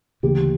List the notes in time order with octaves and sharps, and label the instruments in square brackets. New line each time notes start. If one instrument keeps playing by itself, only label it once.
[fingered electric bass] D2 C#3 E3 A#3 [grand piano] G4